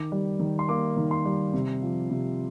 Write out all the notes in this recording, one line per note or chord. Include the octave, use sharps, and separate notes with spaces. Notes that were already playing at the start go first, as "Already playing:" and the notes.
Already playing: D#3 D6
G3
D#3
C6
A#3 D6
D#3
C6
G3
C3
F3
C3